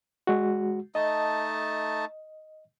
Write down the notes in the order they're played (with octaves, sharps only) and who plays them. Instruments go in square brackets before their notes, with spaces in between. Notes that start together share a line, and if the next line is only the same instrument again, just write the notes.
[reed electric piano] G#3 F#4
[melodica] A3 D#4 A5 [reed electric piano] D#5